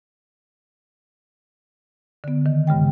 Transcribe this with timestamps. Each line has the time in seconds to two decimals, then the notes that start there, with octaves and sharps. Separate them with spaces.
2.24 D3 B3
2.46 D#3
2.67 G2 C#3 G#3 G5